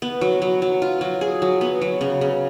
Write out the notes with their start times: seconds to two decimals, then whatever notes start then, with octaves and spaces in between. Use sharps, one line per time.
0.02 B3
0.21 F#3
0.42 F#3
0.62 F#3
0.82 F4
1.01 F#3
1.21 G#4
1.42 F#3
1.61 B3
1.81 F#3
2.01 C#3
2.21 C#3